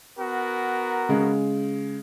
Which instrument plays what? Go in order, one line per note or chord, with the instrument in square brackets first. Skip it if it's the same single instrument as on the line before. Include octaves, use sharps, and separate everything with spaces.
[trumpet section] B3 F#4 A#4
[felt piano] C#3 G#3